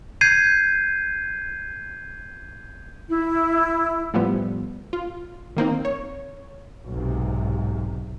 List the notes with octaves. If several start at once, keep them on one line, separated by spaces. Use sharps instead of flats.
G6 G#6 C7 D#7
E4
A2 F3 G3 B3
F4
D#3 A#3 C4 D#4
C#5
B1 G#2 C3